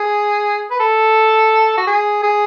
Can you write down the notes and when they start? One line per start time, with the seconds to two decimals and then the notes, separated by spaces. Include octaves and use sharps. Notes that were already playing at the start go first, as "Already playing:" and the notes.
Already playing: G#4
0.71 B4
0.80 A4
1.78 F#4
1.87 G#4
2.23 G#4